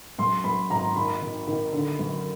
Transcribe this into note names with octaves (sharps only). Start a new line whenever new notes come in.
F#2 C6
F#2 B5
G#1 A#5
D#3 B5
D#3
D#3
D3
F#2